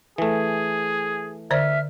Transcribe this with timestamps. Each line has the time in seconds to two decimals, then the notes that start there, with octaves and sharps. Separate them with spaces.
0.18 E3 A3 G#4
1.51 D3 C5 D5 E5 F6